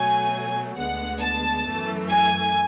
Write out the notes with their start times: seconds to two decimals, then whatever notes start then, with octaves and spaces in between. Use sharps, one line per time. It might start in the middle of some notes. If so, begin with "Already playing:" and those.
Already playing: B2 F#3 A3 G#5
0.77 D2 D3 G#3 B3 F#5
1.21 A5
1.66 F#2 E3 A3
2.10 G#5